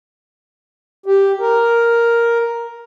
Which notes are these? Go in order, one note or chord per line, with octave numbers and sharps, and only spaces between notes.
G4
A#4